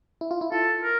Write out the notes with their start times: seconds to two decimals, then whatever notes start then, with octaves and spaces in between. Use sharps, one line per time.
0.21 E4
0.31 F4
0.41 E4
0.51 F4 A4
0.83 A#4